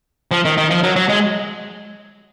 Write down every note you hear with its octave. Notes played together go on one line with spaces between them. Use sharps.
F3
D#3
D#3
F3
F#3
F#3
G#3